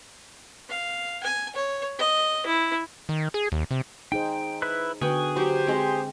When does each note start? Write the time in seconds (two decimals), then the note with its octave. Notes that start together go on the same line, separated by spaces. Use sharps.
0.70 F5
1.23 G#5
1.56 C#5
1.99 D#5
2.46 E4
3.09 D#3
3.34 G#4
3.52 D#2
3.71 C3
4.12 D#4 G#4 C5 G5
4.62 E4 B4 F#6
5.01 D3 B3 F#4 G#4 G5
5.37 F#3 G4 C5
5.67 G#3 C4